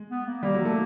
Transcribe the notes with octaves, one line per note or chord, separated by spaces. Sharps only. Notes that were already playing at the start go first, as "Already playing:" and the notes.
Already playing: G#3
B3
A#3
G3 A#3
F#3
A3